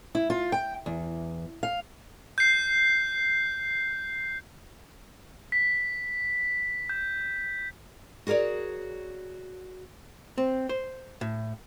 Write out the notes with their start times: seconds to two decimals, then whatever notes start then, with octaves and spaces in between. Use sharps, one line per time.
0.15 E4
0.30 F4
0.52 G5
0.86 E2
1.63 F5
2.38 G6 C7
5.52 B6
6.89 G6
8.27 F#4 G#4 A#4 C#5 D5
10.38 C4
10.69 C5
11.21 A2